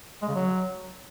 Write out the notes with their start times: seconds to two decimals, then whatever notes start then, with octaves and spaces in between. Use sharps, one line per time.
0.22 G#3
0.28 C#3
0.34 F#3